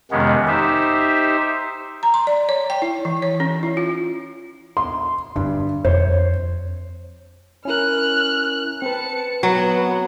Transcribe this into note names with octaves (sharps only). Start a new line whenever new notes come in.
F2 C3 D#3 G#3 B3 C#4
D#4 G4 C5 E5
A#5
C6
D5
C#5
G5
E4
E3
C#5
C#4
E4
F4
C6
G2 D3
F2 C5 C#5
C#4 E4 A#4 F6 F#6
C4 B4 A5 C#7
F#3 B3 F#4